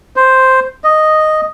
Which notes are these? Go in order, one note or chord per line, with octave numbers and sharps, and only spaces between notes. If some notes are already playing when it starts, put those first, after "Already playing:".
C5
D#5